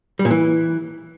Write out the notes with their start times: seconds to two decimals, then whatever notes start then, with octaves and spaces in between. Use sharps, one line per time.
0.19 G3
0.25 A#2
0.31 E3